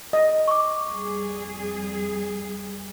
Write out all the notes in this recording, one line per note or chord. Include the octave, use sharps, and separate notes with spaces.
D#5
C#6 D6
F2 G3 G#4